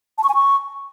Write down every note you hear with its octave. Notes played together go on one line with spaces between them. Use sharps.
A5
C#6
G#5
C#6